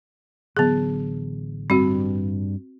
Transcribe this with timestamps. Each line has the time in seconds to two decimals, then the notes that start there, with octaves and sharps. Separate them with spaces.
0.57 A1 D3 F#3 B3 G#4
1.70 G2 G3 C4 F#4